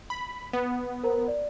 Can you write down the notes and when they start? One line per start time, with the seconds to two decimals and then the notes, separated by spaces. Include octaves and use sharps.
0.10 B5
0.53 B3
1.03 A#4 C5 A#5
1.28 D5